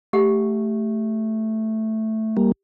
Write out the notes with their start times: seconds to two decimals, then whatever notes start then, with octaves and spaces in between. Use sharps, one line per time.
0.13 A3 G4 F#5
2.37 G3 A#3